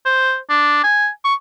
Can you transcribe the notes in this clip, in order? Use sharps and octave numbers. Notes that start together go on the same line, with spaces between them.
C5
D4
G#5
C#6